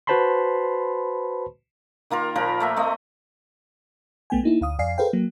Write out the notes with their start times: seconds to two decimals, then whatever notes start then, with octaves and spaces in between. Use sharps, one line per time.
0.07 F#4 B4 C5 A5 B5 C6
2.10 D#3 A#3 F4 A#4
2.36 A#2 F3 A#4 B5
2.60 A3 A#3 E5
2.76 A3 C4 D#5
4.30 B1 A3 B3 G5 G#5
4.44 A#3 D#4 E4
4.61 D2 F5 D#6
4.79 F2 D5 F5 G#5 C7
4.98 G#4 A4 B4 C5 F5 G5
5.13 F#3 A#3